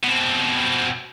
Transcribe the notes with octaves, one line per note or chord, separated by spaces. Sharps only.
B2 C4